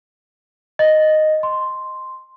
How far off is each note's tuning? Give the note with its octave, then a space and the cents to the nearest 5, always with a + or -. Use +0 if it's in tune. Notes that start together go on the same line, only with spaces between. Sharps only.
D#5 -5
C6 +0